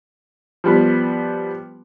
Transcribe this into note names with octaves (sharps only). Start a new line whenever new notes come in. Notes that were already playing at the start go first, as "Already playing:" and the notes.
F3 G3 B3